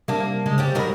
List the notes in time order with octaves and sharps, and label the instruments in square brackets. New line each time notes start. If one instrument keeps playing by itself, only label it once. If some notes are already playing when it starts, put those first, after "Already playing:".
[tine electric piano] C3 G3 E5 [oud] A#3 D4
[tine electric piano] C#3 [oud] G#3
[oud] G3 C#4 G4
[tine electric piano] C3 G3 B5 [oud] F#3 D#4 A#4